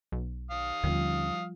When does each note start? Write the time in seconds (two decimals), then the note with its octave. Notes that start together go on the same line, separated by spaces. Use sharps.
0.12 B1
0.51 F5 D#6
0.84 D#2 D3 F3 G3 C#4 F4